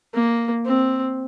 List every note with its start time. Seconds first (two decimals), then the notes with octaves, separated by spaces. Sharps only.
0.14 A#3
0.66 C4